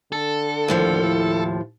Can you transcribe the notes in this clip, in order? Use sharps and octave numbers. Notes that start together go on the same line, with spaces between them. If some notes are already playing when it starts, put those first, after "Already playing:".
D3 A4
D#2 A2 F3
E4